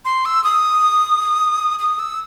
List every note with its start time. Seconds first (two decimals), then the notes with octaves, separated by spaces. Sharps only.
0.05 C6
0.25 E6
0.44 D#6
1.79 D#6
1.99 E6